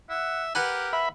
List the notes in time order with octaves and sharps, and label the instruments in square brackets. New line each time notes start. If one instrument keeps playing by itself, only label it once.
[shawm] E5 [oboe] F#5
[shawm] G4 [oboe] A#4 [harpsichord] B4 F#5 G#5
[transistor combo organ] E5 B5